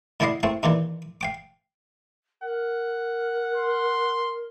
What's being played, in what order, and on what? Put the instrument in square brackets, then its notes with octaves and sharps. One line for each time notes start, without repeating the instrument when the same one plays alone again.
[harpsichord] A2 D3 D4 E4 D#5 F5
A2 A3 C4
G2 A#2 D#3 E3
F5 G5 D6
[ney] A#4 [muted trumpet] F#5
[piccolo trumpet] C6